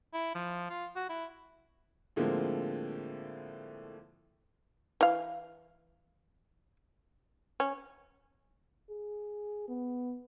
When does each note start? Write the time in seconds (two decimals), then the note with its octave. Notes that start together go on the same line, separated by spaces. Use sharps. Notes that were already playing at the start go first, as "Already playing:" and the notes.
0.13 E4
0.35 F3
0.70 F4
0.96 F#4
1.10 E4
2.16 A2 D3 F3 G#3 A#3 C4
5.01 E3 F5
7.60 C#4
8.90 G#4
9.68 B3